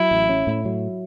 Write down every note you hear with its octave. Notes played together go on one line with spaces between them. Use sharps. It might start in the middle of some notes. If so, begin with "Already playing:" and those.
Already playing: F#3 E4
A1
C#4
A2
F#3